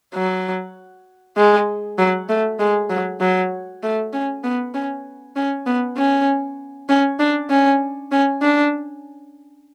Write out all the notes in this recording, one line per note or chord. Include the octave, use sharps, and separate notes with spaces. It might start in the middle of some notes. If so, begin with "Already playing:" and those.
F#3
G#3
F#3
A3
G#3
F#3
F#3
A3
C#4
B3
C#4
C#4
B3
C#4
C#4
D4
C#4
C#4
D4